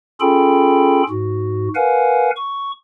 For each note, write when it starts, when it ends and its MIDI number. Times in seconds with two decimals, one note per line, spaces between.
0.20 1.03 61
0.20 1.03 65
0.20 1.03 68
0.20 1.03 69
0.20 1.03 79
0.20 1.03 83
1.09 1.68 44
1.09 1.68 66
1.75 2.30 70
1.75 2.30 71
1.75 2.30 77
1.75 2.30 78
1.75 2.30 80
2.36 2.72 85